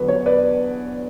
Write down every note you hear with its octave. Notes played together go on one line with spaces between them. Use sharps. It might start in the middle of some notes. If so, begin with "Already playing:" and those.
Already playing: E2 D3 F#3 B4
C#5
B4 D5